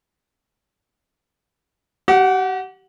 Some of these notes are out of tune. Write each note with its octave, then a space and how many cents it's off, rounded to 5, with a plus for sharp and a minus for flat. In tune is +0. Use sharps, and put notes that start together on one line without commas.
G4 -35 F#5 +0